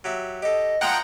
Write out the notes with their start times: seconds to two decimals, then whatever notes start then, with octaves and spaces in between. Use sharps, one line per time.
0.04 F#3 G4 E5
0.42 G4 A4 D#5
0.81 F3 G#3 D4 F#5 G5 A#5